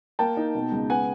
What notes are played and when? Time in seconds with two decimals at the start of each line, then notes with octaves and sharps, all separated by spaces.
0.19 A#3 G5 A5
0.37 D#4
0.55 B2
0.72 C#2
0.90 B3 F#5 G#5